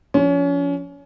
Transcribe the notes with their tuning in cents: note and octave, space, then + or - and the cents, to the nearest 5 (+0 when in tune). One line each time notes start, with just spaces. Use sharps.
F3 +0 C#4 +30